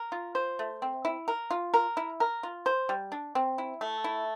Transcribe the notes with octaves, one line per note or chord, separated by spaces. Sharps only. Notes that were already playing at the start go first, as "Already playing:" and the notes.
Already playing: A#4
F4
C5
A3
C4
E4
A#4
F4
A#4
E4
A#4
F4
C5
G3
D4
C4
E4
A3
E4